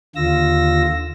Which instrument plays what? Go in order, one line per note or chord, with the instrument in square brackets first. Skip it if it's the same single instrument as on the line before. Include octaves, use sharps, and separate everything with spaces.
[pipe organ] D#2 D3 F4 E6 A#6